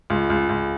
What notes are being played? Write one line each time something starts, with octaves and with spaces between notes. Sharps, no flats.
C#2
C#2
C#2